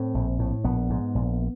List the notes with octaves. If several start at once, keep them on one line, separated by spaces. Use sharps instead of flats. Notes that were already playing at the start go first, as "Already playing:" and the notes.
Already playing: A2 C4
A#1
A2
A#1 B3
G#2
A#1